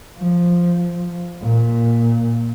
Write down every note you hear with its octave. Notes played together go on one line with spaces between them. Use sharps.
F3
A#2